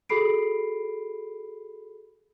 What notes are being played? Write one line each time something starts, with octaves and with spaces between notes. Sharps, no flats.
F#4 G#4 A4 B5 C7 D7